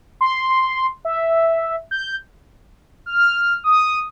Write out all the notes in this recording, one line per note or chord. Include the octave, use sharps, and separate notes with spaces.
C6
E5
G6
F6
D#6